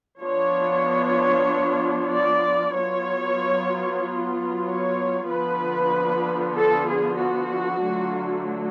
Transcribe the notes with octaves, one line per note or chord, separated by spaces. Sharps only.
F3 B3 D4 F4 C#5
D5
F#3 B3 F4 C#5
C#5
D3 F3 B3 F4 B4
A4
G#4
F#4
D3 F#3 A3 D4 F4